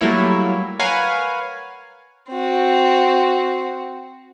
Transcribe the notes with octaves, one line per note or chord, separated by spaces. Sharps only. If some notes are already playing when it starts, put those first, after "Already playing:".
F#3 G3 A3 A#3 E4 C#5
A#4 B4 C#5 F5 F#5 G#5
C4 F#4